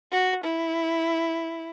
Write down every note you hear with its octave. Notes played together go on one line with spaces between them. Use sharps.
F#4
E4